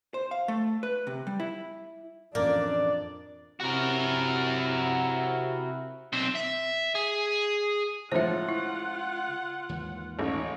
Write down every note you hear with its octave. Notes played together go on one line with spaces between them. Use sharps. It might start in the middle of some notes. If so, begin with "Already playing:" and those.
C5
F5
A3
B4
C3
G3
E4
F2 A2 E3 A#3 C#4 D4 D5
C3 E4 F#4 A#4
B1 C4
E5
G#4
A2 C#3 F3 G#3 F4 C5 E5 F#5
E4
D#2 G#2 E3
A1 D#4 C#5